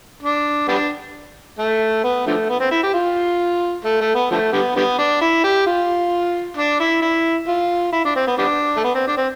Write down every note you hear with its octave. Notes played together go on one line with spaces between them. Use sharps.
D4
G3 B3 D4
A3
B3
D3 F3 A3
B3
C4
E4
G4
F4
A3
A3
B3
D3 F3 A3
D3 G3 B3
D3 G3 B3
D4
E4
G4
F4
D4
E4
E4
F4
E4
D4
C4
B3
G3 B3 D4
A3
B3
C4
D4
C4